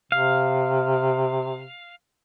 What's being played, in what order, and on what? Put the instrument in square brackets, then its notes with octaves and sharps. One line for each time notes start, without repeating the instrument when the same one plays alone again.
[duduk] C3 [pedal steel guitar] F5